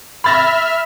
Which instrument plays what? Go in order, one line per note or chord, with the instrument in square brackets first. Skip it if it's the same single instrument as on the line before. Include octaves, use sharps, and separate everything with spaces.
[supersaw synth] E5 F6 [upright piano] B5 A6 A#6